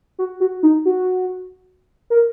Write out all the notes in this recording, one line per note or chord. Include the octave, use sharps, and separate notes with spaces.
F#4
F#4
D#4
F#4
A#4